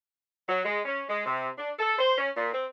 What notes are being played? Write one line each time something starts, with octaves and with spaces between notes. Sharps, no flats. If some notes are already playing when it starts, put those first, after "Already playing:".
F#3
G#3
C#4
G#3
C3
D4
A4
C5
C#4
A#2
C4